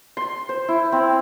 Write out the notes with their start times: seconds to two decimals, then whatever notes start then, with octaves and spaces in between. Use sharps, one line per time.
0.17 C6
0.49 C5
0.68 E4
0.92 C4